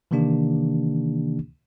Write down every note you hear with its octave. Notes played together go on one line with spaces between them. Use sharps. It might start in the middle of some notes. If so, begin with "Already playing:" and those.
C3 D#3 E3 A#3 D4 G4